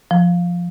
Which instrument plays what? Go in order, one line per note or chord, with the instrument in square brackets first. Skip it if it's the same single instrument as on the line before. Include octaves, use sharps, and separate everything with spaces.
[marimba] F3